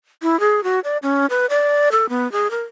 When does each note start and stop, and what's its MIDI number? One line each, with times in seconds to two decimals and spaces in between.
0.22 0.39 64
0.40 0.64 68
0.64 0.80 66
0.84 0.97 74
1.03 1.26 61
1.30 1.46 71
1.50 1.89 74
1.92 2.09 69
2.09 2.30 59
2.32 2.50 68
2.51 2.62 70